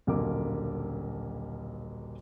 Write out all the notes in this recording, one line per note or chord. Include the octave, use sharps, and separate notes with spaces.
D#1 B1 D3 A#3 A#4 D6